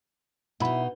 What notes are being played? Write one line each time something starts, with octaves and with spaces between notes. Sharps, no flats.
B2 D#4 E4 B5